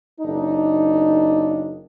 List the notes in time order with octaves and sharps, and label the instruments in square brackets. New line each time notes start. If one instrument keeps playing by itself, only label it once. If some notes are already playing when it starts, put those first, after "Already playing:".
[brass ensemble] F#1 D4 D#4